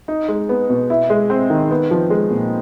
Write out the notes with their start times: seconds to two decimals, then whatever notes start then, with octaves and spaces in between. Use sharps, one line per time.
0.08 D#4
0.28 G#3
0.49 B3
0.69 B2
0.90 E4
1.10 G#3
1.30 C4
1.50 D#3
1.71 B3
1.91 F3
2.10 G#3
2.31 A#2